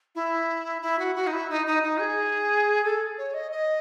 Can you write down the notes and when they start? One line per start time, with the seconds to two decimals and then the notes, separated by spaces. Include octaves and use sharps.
0.15 E4
0.82 E4
0.99 F#4
1.15 F#4
1.27 D#4
1.32 E4
1.49 D#4
1.66 D#4
1.83 D#4
2.00 G#4
2.84 A4
3.18 C#5
3.34 D#5
3.51 D#5